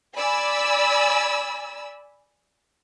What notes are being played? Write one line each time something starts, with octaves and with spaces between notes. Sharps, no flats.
D5 G#5 B5 E6